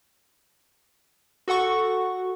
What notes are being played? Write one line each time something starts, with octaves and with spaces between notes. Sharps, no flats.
F#4 A4 F#5 C#6